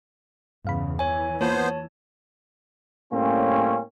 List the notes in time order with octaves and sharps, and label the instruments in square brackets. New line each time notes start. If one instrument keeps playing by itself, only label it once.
[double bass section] E2 C#3 [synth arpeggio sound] G2 F5 B5
[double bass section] E3 [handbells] C#5 G#5
[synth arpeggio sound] A#3 F4 [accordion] B3 C5 [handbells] C#5 A5
[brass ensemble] A2 G3 A#3 C4 C#4